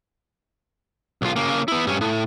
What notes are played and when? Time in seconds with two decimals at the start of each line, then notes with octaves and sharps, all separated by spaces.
1.22 B1 F4
1.36 C#3 A#3
1.68 B3 E4
1.87 G2 C#4
2.01 A2